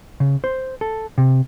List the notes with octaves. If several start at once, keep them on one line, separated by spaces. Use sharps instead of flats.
C#3
C5
A4
C3